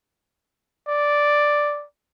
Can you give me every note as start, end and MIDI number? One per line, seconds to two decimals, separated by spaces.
0.88 1.85 74